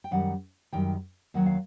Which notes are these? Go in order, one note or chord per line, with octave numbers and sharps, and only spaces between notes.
G5
F#2 D#3 G3 F#5
F#2 D#3 G3 G5
D#2 D#3 F#3 F#5
F5